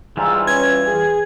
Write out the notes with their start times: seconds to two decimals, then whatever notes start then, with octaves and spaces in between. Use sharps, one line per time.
0.17 G#2 E3 G3 F4 G#5 A#5 E6
0.47 C#4 B4 G#6
0.88 G#4